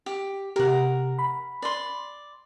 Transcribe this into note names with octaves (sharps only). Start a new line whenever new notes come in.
G4
C3 G4 A#4 F#5
B5
D5 C6